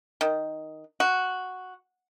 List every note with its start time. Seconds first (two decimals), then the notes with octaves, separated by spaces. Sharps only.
0.21 D#3
1.00 F#4